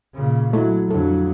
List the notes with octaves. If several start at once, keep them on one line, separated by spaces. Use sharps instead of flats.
A#2 C#3
F#3 A3 E4
F2 D3 F#3 A4